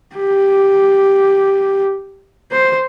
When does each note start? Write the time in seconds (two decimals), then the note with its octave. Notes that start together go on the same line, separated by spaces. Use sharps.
0.15 G4
2.52 C5